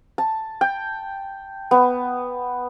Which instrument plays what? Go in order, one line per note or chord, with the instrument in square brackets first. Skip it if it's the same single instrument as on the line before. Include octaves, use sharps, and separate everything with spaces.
[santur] A5
G5
B3